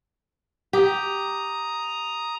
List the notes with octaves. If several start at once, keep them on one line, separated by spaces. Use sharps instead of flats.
G4 A#5 D#6